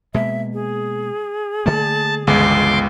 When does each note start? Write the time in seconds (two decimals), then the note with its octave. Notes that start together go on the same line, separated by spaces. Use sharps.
0.14 B2 G#3 A#3 E5
0.53 G#4
1.66 D3 A3 A#3 A5
2.27 G1 C#2 D3 E3 G#3 B3 C6 D6